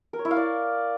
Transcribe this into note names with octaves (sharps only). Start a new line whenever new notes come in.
A#4
C#5
E4
F5
D5